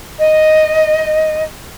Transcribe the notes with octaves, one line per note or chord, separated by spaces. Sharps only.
D#5